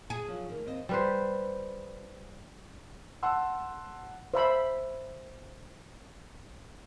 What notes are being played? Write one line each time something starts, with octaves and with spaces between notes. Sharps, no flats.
G#4
F3 F#3
D2 D#3
D#2 C4 D#5
G3 B4 C5
F#5 A5 C6 E6
C5 E5 B5